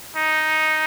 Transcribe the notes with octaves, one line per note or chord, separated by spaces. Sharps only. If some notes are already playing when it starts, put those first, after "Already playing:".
D#4